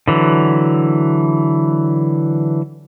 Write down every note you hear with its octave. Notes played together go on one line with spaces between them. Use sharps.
D3 E3 F#3